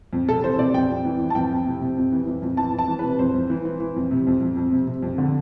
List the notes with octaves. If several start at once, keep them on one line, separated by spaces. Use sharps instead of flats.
F2
C3 A4
E3 C5
C3 D5
F2 G5
F2
E3
E3
A5
F2 G5
F2
C3
C3
F2
E3
F2
F2
E3 A5
F2
A5
E3
C3 B4
F2 C5
F2
E3
E3
E3
F2
C3
F2
F2
F2
C3
C3
F2
D3